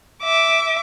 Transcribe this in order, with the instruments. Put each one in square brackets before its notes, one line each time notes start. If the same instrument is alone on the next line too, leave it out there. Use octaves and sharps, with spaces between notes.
[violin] E5 D6